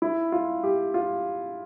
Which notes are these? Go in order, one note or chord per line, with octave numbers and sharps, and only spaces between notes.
E4
F4
G4
F4